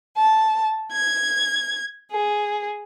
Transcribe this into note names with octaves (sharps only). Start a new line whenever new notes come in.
A5
G#6
G#4